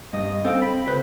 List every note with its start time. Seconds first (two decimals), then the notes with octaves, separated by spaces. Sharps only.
0.13 G2 D#5
0.45 C4 A4 F5 G5
0.62 B5
0.88 C#2 B4 C5